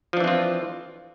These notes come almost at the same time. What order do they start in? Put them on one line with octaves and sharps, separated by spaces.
F3 D4 E3 C4 F4